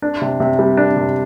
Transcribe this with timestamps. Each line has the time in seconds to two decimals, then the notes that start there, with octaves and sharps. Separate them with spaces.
0.02 D4
0.22 C3
0.40 C3
0.59 G3
0.77 D4
0.97 C3